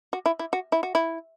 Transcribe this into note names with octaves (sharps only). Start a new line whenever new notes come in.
F#4
E4
E4
F#4
E4
F#4
E4